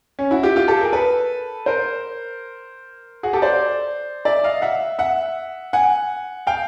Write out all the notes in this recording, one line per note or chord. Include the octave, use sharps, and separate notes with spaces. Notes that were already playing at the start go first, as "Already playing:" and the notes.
C#4
E4 F#4
F4 G4
F4 G4
G4 A4
G#4 A#4
A4 B4
A#4 C5
F#4 G#4
G4 A4
C5 D5
D5 E5
D#5 F5
E5 F#5
E5 F#5
F#5 G#5
F5 G5